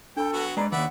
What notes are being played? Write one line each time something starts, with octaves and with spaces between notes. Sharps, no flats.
D4 A4 G5 A5 B5
F#3 B3 F#4
G#3 B4 D5 A#5
D#2 E3 B4 D5 E5 F#5